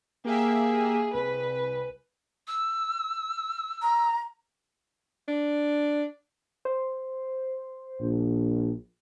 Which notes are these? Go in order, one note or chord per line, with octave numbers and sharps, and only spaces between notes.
A#3 G4 G#4 E5
C2 B4
E6
A#5
D4
C5
A#1